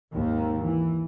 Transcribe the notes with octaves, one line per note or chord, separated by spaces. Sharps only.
G#1 D#2 D#3
E3